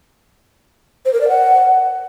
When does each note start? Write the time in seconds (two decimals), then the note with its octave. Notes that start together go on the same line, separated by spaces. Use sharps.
1.05 C5
1.13 A#4
1.21 D5
1.29 F#5